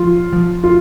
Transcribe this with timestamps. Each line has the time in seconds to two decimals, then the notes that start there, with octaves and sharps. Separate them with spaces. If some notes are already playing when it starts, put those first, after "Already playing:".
Already playing: F3 F4
0.33 F3
0.64 F4